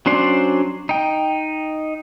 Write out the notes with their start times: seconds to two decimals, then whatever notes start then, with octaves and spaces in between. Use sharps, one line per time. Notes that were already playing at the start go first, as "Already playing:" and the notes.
0.06 F#3 C#4 D4 C5 D5
0.89 D#4 G5